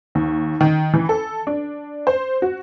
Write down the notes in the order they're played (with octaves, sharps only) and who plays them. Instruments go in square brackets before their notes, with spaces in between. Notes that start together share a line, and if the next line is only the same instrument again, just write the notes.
[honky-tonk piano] D#2
D#3
E3
A4
D4
C5
F#4